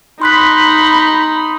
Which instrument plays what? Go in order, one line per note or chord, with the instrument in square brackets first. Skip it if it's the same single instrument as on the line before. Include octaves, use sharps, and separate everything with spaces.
[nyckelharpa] D#4 [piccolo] B5 [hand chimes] C6 F#6 B6